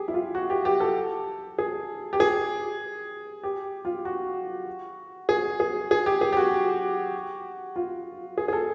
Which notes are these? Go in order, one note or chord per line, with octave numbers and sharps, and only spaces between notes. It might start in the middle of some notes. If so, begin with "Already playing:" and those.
Already playing: G4 G#4
E4
F4
F#4
G4
G4
A4
G#4
G4
G#4
G4
F4
F#4
G#4
G#4
G#4
G4
G#4
G4
F#4
F4
G#4
G#4
A4